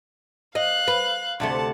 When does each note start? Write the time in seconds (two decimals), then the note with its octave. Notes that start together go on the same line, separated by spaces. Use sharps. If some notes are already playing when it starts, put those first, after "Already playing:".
0.55 D#5 F5 F#6
0.88 B4
1.40 D2 C3 A3 F#5 A5